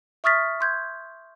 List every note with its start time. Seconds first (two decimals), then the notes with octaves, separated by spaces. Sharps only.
0.24 E5 C#6 D#6 F6 A6 B6
0.61 C6 G6 G#6